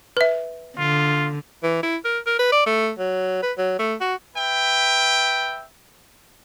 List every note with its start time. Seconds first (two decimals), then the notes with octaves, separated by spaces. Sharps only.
0.17 B4 E5
0.78 D3 F4
1.63 E3
1.83 E4
2.04 A#4
2.26 A#4
2.39 B4
2.52 D5
2.66 A3
2.98 F#3
3.43 B4
3.58 F#3
3.79 A3
4.01 F#4
4.36 B4 E5 G5